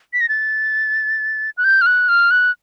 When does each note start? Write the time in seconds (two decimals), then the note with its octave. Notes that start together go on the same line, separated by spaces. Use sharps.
0.13 B6
0.21 A#6
0.29 A6
1.57 F#6
1.64 G6
1.82 F6
1.86 F#6
2.09 F6
2.31 F#6